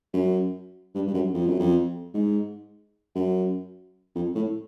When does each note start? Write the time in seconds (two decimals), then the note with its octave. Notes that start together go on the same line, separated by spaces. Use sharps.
0.13 F#2
0.94 G2
1.08 G2
1.14 F#2
1.34 F2
1.47 F#2
1.59 F2
2.14 G#2
3.15 F#2
4.15 F2
4.35 A2